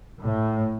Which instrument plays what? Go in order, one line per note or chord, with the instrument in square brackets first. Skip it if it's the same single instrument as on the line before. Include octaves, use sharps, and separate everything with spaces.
[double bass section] A2